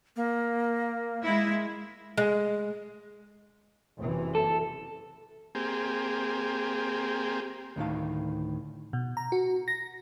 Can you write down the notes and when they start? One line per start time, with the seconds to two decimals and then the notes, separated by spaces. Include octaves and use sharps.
0.16 A#3
1.24 G#3 E4
2.17 G#3
3.98 F#1 C3 E3
4.35 A4
5.55 A#3 C4 G4 G#4
7.76 D2 A2 D#3 F5
8.93 B2
9.17 A#5
9.32 F#4
9.68 A#6